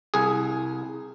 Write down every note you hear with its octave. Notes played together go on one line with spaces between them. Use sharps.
C2 G#4